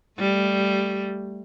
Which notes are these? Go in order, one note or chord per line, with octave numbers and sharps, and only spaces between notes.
G3 A3